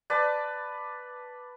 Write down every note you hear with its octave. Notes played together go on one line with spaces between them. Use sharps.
B4 D5 A5